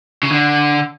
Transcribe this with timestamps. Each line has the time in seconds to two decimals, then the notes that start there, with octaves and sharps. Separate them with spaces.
0.23 C#3
0.31 D3